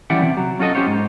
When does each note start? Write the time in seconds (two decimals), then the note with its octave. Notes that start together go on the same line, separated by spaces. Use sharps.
0.10 E3 G3 C#4 D5 E5 F#5
0.22 C3
0.37 F#3
0.59 C#4 F4 F#4 A4 D#5
0.75 C#4 G4 C5 C#5
0.87 G#2